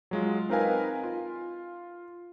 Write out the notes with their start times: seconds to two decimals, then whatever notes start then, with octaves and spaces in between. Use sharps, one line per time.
0.11 F#3 G#3 F4
0.49 C4 D#4 A#4 B4 F5 G#5
1.04 F4